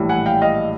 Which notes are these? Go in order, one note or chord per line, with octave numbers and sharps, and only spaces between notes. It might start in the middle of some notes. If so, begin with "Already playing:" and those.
Already playing: A#1 A2 E3 G3
F#5 G#5
F5 G5
D#5 F5